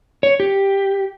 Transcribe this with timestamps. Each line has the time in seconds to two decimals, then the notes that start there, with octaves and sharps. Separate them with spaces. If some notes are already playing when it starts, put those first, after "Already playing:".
0.23 C#5
0.40 G4